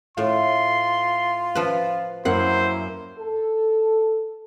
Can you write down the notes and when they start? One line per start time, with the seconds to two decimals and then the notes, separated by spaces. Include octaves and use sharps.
0.17 A2 F4 C6
1.55 F3 B4
2.25 F#2 A#3 E4 C5 F#5 C7
3.18 A4